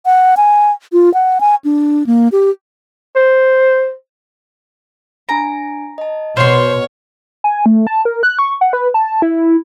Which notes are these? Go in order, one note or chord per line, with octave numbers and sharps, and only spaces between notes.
F#5
G#5
F4
F#5
G#5
D4
A#3
G4
C5
D4 G#5 A#5 D7
D#5 A5
B2 C5 C#5 C6 F6
G#5
A3
A5
A#4
F#6
C#6
F#5
B4
A5
E4